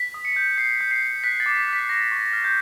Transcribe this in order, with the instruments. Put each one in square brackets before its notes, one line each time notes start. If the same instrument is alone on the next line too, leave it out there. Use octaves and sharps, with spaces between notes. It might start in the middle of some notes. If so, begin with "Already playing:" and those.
Already playing: [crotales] B6
D#6
C#7
G6
G6 C7
G6
C7
G6
F#6 B6
A6
D6
B6
F#6
B6
C#6 A#6
C#6
F6
G6